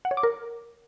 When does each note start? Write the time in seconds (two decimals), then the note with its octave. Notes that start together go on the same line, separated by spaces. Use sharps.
0.05 F#5
0.11 C#5
0.17 D6
0.23 A#4